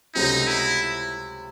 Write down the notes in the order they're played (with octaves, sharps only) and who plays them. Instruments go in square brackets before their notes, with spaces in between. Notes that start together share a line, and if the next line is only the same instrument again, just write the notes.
[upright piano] C#2 C3 F#3 A3 C#4 [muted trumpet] D#4
[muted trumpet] E4